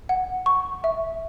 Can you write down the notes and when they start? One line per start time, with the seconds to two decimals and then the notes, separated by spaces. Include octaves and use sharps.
0.09 F#5
0.46 C#6
0.84 E5